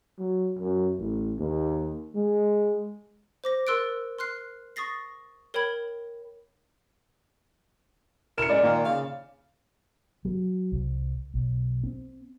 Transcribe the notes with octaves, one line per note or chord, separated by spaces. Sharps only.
F#3
F#2
A1
D#2
G#3
C5 D6 A#6
A#4 C6 E6 F#6 A6 D7
C6 F6 F#6 C7
C#6 D#6 A6 A#6 C7
A#4 C#5 G5 B5 G#6
A#4 C#7 E7
G#3 D5
A#2 D#3 A#3
C#3 F5
F#3
C2
B1
C4